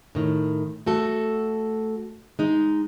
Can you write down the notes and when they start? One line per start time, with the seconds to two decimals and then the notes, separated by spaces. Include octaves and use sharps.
0.15 A2 D#3
0.86 A3 F#4 A4
2.39 G#3 D#4